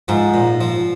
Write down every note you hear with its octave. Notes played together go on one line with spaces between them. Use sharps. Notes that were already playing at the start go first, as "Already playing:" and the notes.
G#2 F3
A#2
F3